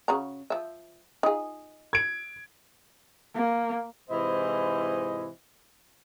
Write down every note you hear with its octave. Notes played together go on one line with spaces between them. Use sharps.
C#3 F#4 A#5
F3 E5
D#4 F4 G#4
G#6 D7
A#3
G#2 C3 E3 E4 C5 D#5